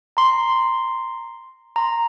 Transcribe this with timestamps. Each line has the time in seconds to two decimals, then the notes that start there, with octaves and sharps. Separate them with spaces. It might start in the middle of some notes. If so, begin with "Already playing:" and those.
0.17 A#5 C6
1.76 A#5 C6